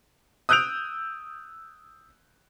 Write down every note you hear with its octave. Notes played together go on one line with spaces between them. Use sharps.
D#6 E6 F#6 G6 D7 F7